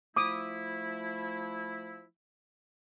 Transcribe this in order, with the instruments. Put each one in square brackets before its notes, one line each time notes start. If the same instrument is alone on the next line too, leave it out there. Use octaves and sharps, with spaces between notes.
[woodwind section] F3 A3 E4 [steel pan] D6 D#6